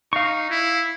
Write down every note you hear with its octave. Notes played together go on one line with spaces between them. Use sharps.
D#4 F5 C#6
E4